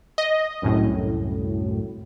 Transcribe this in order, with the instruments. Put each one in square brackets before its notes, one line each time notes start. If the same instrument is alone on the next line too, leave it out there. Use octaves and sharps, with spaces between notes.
[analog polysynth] D#5
C2 F#2 A2